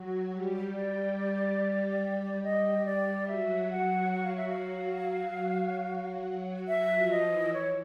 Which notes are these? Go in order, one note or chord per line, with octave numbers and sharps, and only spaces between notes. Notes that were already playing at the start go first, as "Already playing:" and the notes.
Already playing: F#3 F#4
G3 G4
G3 G4 D5
G3 G4 D#5
G3 G4 D5
F#3 F#4 E5
F#5
F#5
F5
E5
F5
F#3 F#4 E5
F3 F4
D#5
E3 E4
C#5